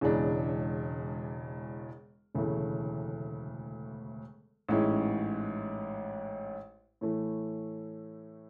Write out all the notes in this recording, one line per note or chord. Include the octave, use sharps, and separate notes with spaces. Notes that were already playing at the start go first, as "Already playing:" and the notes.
E1 E2 C#3 G#3 D4
E1 D2 C#3 E3 A3
A1 G#2 G#3 C#4 E4
A2 E3 A3